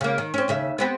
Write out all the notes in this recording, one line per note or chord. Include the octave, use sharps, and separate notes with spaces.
C#3 A#3
D#3
C4 C#4
D#2 C#3 E5
B3 C4 G4